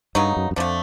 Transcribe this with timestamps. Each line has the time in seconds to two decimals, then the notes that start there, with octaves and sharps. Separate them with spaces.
0.15 G2 C#3 F#3 B3 D#4
0.37 F#2
0.51 F#2
0.56 F2 D3 F3 A3